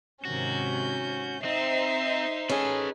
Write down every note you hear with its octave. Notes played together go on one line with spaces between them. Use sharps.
G#2 C3 D#3 C#4 F#4 G6
C4 D#4 C5 E5 C7
C#4 G#4 A4 B4